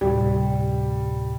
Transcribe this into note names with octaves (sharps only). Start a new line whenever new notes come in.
D2 A2 C3 G3